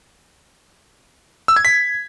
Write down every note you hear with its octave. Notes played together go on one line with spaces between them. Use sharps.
E6
G#6
B6